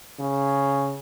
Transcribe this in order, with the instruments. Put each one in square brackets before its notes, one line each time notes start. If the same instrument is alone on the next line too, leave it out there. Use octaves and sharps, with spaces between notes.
[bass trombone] C#3